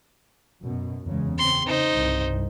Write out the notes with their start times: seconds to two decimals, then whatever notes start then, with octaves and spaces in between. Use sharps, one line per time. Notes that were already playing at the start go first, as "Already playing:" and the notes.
0.61 F#2 B2
1.05 E2 C#3 G#3
1.39 C#3 C4 C6
1.67 C#3 D#4 C5
1.96 C2 G2